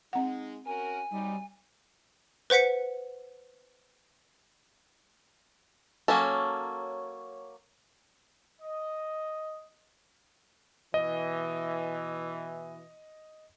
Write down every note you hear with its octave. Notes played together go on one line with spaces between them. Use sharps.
G#3 C4 D#4 F#5
C#4 F#4 A#4 G#5
C3 F#3 G3 D#4
B4 C5 F#5 B6 C#7
F#3 A#3 C#4 A4
D#5
B2 E3 D#5